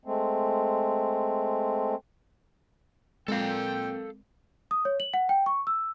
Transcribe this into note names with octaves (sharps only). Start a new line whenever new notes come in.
G#3 A3 C4
A#2 G#3 C4 A4 A#4 F5 G5
D#6
C#5
F#7
F#5
G5
C#6
E6